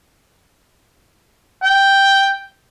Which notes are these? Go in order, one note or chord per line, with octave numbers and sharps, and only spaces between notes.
G5